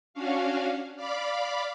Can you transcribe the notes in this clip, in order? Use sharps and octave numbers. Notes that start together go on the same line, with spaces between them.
C#4 D4 F#4 F5
D5 F5 B5 D6